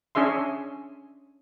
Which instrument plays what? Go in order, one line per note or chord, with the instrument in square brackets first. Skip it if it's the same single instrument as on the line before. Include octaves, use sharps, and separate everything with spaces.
[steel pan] C#4 D4 G#4 E5 C6